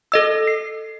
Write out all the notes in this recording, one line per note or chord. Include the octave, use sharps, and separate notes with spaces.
A4 D#5 E6
C7